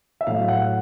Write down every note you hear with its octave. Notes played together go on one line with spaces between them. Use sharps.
E5
A2 F#3 F5
F#5